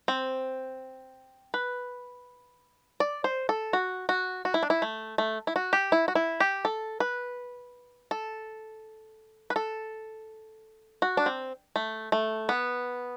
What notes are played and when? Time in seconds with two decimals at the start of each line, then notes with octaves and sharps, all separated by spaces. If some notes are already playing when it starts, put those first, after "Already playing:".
0.08 C4
1.54 B4
3.00 D5
3.24 C5
3.49 A4
3.73 F#4
4.09 F#4
4.45 F#4
4.54 E4
4.63 D4
4.70 E4
4.82 A3
5.18 A3
5.47 E4
5.56 F#4
5.73 G4
5.92 E4
6.08 F#4
6.15 E4
6.40 G4
6.65 A4
7.00 B4
8.11 A4
9.50 B4
9.56 A4
11.02 F#4
11.17 D4
11.26 C4
11.76 A3
12.12 A3
12.49 B3